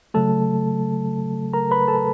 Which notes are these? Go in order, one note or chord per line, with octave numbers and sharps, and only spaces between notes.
C#3 F#3 A3 A4 A5
A#4 A#5
B4 B5
A4 A5